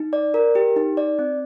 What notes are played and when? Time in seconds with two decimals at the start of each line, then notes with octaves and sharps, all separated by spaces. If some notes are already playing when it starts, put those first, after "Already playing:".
Already playing: D#4
0.13 D5
0.34 A#4
0.55 G4
0.76 D#4
0.97 D5
1.19 C4